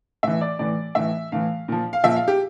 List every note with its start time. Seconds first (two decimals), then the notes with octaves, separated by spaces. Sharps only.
0.23 A2 E3 E5
0.41 D5
0.59 A2 E3 D5
0.95 A2 E3 E5
1.32 A2 E3 F5
1.68 A#2 F3
1.93 F5
2.03 A#2 F3 E5
2.16 F5
2.28 G4